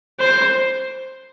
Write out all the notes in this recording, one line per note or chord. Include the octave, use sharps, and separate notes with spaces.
C5